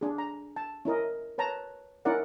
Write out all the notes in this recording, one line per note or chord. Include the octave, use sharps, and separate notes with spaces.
D4 G#4
A#5
A5
C#4 E4 A#4 D#5
B4 C#5 A5 A#5
C#4 D#4 E4 A#4 D5 F#5